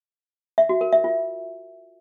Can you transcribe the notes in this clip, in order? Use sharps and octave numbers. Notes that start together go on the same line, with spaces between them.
E5
F#4
A#4
E5
F4